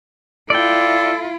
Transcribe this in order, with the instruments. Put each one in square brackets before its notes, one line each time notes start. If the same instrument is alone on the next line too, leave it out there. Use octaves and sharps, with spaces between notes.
[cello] E4 F4 [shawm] A4 [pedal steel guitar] D5 G5